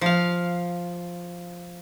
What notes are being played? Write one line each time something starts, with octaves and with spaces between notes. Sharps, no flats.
F3 F5